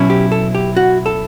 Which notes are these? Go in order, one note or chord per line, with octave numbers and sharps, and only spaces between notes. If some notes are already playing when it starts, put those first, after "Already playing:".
Already playing: B2 F#3 C#4 E4
G4
A4
G4
F#4
A4